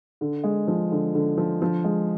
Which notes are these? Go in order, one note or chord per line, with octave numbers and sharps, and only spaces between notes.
D3
G#3
F3
D3
D3
F3
F3
G#3